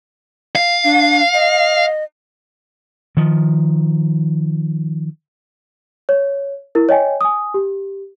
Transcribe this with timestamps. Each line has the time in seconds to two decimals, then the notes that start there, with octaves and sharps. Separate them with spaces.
0.56 F5
0.84 D4
1.34 D#5
3.17 D#3 F3
6.09 C#5
6.75 E4 A#4
6.89 C#5 D#5 G5 G#5
7.21 G#5 D#6
7.54 G4